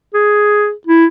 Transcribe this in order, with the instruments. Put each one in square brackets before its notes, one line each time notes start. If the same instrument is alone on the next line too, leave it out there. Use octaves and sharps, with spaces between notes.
[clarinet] G#4
E4